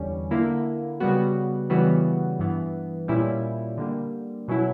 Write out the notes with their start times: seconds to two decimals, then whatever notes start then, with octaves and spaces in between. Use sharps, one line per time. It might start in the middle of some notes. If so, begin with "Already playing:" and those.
Already playing: E2 D3 G3 C#4
0.31 D3 A#3 E4
1.00 C#3 G3 B3 F#4
1.70 C#3 E3 G3 B3 F#4
2.39 G2 E3 B3
3.08 A#2 G3 C#4 E4
3.77 D3 G3 A#3
4.48 B2 F#3 C#4 E4